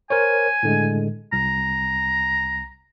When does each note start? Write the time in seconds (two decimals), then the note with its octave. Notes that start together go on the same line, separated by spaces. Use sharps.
0.10 A#4 C5 C#5 G#5
0.63 A2 D3 G#3
1.33 C2 A#5